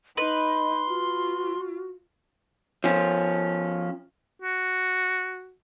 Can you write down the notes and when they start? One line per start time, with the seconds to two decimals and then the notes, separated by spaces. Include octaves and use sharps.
0.17 D#4 B4 D#5 C6
0.87 F4 F#4
2.84 F3 C#4
4.42 F#4